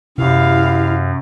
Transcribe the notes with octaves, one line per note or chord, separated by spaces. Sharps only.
F#2 C3 E4 G4 F5